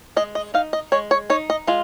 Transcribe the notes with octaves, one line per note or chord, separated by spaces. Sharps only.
G#3 D#5
D#5
D#4 F5
D#5
G#3 C#5
C#5
D#4 C#5
D#5
G#3 F4